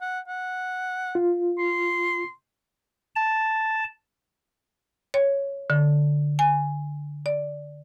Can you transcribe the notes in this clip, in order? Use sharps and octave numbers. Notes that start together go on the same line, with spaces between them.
F#5
F#5
F4
C6
A5
C#5
D3
G#5
D5